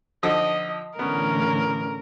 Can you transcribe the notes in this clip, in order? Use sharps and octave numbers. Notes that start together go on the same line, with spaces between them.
D3 F3 D#4 D#5
A2 D3 E3 B3 C#4 A#4